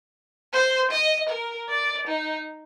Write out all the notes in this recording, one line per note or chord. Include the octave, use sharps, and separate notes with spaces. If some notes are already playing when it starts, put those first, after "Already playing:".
C5
D#5
A#4
D5
D#4